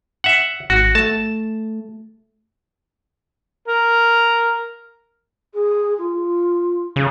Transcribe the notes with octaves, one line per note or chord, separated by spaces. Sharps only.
E5 F#5
G#1 F#4
A3 A5
A#4
G#4
F4
C#3